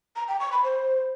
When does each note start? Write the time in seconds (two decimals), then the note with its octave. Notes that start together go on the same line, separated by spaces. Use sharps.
0.16 A#5
0.28 G5
0.40 C#6
0.52 B5
0.64 C5